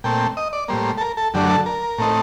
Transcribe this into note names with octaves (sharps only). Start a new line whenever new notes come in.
A#2 A3 C4 G5
D#5
D5
A2 G3 A#3 C5
A4
A#4
A4
F#2 D3 F#3 A3 D4 G4
A4
A#4
A2 A3 C4 D#4